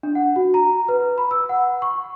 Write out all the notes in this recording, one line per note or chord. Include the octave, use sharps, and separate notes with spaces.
D4
F#5
F#4
A#5
B4
B5
E6
F#5
C#6